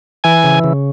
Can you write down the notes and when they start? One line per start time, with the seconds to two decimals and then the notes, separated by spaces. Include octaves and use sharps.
0.24 E3 G#5
0.44 C#3
0.64 C#3